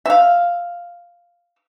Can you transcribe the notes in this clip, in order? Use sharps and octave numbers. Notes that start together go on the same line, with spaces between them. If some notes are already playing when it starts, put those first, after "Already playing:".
E5 F5